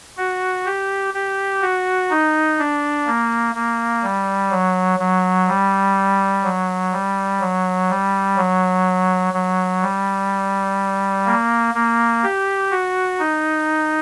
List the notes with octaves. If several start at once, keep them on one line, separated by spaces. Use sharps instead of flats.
F#4
G4
G4
F#4
D#4
D4
A#3
A#3
G3
F#3
F#3
G3
F#3
G3
F#3
G3
F#3
F#3
G3
A#3
A#3
G4
F#4
D#4